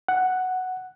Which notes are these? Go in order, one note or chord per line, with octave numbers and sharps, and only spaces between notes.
F#5